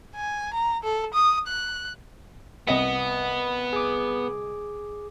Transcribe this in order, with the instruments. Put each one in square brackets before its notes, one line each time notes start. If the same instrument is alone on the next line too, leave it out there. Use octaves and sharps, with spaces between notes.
[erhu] G#5
A#5
A4
D#6
F#6
[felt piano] C2 D#5 C#7 [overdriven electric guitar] B3
[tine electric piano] G#4 D6